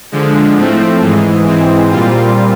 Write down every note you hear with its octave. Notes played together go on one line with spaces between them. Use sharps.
D3 F3 G#3
A2 F3 A3 C4
G#2 E3 G#3
G#2 E3 G#3 C4
A#2 G3 C4 F4